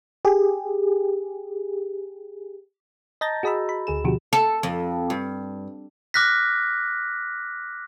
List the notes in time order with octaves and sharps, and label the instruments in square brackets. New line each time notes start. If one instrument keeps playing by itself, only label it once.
[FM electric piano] G4 G#4
[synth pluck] D#5 A5 A#5 G6 A6 A#6
F#4 G#4 D#5 A#5 B5 E6
B5
D2 G#4 E7
B2 D3 F3 F#4 G4
[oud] A4
F2
G2
[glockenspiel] D6 F6 F#6 A#6 B6